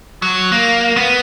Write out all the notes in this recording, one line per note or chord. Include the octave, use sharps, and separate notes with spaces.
F#3
A#3
B3